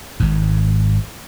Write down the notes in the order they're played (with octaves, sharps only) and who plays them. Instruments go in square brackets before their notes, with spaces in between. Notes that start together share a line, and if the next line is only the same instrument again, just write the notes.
[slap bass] G#1 G#2